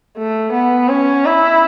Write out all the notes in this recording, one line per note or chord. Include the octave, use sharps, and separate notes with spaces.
A3
B3
C#4
E4